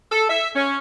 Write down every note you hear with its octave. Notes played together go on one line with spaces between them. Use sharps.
A4
E5
C#4